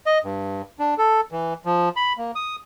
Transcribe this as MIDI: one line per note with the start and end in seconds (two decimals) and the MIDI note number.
0.06 0.18 75
0.24 0.62 43
0.79 0.94 62
0.98 1.21 69
1.32 1.53 52
1.65 1.89 53
1.96 2.13 83
2.18 2.31 58
2.35 2.56 87